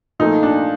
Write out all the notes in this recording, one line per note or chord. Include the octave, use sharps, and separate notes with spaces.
A#2 F3 A3 D#4
D4